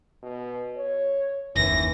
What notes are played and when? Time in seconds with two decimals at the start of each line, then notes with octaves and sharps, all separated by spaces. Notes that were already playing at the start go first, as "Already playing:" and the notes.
0.23 B2
0.76 C#5
1.56 F#1 D#2 E3 A#6